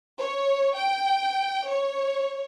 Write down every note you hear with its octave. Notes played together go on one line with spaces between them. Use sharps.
C#5
G5
C#5